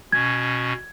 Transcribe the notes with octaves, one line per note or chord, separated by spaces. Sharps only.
B2 C#4 G#6